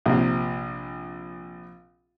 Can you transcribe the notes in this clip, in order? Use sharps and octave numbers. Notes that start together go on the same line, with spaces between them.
A#1 C3